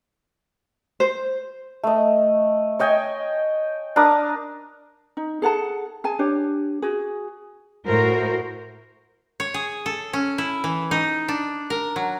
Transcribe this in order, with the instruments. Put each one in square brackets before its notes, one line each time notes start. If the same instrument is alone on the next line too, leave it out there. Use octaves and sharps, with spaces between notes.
[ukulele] C5
[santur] A3 D#5
C#5 D#5 G5 G#5
D4 A#4 D6 D#6
[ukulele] D#4
G#4 A4 F#5 A5
G#4 G#5 A5
D4 G4 C#5
F#4 G#4
[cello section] A2 F#4 A#4 C5
[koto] C#5
G#4
A4
C#4
E4
E3
D#4
D4
A#4
F#3